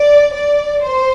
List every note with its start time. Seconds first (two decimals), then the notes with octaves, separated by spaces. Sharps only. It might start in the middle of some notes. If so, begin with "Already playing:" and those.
Already playing: D5
0.33 D5
0.84 C5